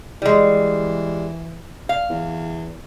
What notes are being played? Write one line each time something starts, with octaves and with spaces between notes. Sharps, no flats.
E3 G3 G#3
F5
E2